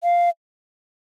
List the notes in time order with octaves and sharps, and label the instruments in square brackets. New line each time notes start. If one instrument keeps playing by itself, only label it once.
[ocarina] F5